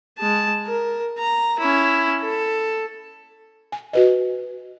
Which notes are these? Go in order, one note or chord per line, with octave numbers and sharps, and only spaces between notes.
G#3 A5
A#4
A#5
C#4 E4
A4
G#5
F#4 B4 D#5